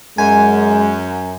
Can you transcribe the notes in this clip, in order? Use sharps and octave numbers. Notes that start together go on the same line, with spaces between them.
F#2 G#3 G#5